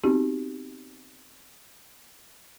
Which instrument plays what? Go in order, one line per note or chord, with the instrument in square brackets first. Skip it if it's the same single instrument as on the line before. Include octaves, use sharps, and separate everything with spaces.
[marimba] B3 C4 D#4 F#4 G4